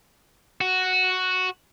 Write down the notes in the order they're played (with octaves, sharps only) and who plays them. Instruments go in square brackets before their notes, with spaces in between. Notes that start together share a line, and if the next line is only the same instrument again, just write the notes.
[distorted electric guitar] F#4